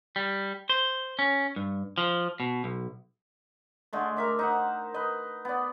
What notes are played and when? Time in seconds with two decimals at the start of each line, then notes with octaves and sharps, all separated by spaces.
0.16 G3
0.69 C5
1.19 C#4
1.56 G2
1.98 F3
2.40 B2
2.64 B1
3.93 D3 G#3 A3
4.17 A#4 E5 D6
4.39 D#4 C5 F#5
4.94 B4 D#5
5.45 B3 D5